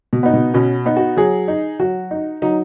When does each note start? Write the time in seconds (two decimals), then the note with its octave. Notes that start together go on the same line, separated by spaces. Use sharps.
0.13 B2
0.23 B3 D#4
0.33 B2
0.54 B2 C#4
0.86 B3 D#4
0.97 F#4
1.17 F#3 G#4
1.48 D#4
1.79 F#3 F#4
2.11 D#4
2.42 F#3 D#4